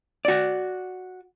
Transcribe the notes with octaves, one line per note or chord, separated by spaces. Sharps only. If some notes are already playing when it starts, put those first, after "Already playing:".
F#4 D5